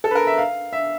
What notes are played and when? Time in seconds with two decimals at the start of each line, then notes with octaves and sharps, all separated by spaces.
0.04 A4
0.11 B4
0.15 A#4
0.27 E5
0.38 F5
0.73 E5